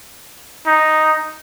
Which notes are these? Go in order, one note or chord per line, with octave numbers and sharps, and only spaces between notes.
D#4